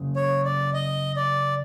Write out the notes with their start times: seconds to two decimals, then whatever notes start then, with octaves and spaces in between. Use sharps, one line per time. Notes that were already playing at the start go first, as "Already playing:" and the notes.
Already playing: F#2 C#3
0.16 C#5
0.45 D5
0.74 D#5
1.16 D5